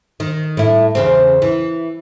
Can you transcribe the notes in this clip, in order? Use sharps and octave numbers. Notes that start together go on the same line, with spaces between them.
D#3
A2 E4
E2 C#3 C4
E3